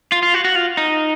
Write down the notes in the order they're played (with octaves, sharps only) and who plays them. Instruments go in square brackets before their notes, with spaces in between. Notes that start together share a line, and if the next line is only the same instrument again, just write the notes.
[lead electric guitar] F4
F4
F#4
F#4
F4
D#4